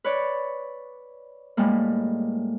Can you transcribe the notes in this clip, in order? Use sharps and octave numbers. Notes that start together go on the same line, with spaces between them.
B4 C#5 D5
A2 G3 G#3 A#3